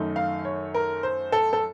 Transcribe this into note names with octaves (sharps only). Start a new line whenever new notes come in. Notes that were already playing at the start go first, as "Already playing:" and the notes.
Already playing: F#2 D#3 A3 D#4
F5
C#5
A#4
C5
A4
A4